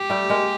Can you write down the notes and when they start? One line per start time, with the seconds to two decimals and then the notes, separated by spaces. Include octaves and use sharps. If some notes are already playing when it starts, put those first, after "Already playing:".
Already playing: G4
0.10 G3 A3
0.29 G#3 A#3